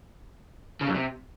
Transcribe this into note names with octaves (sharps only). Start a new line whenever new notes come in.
C#3
F#2
C3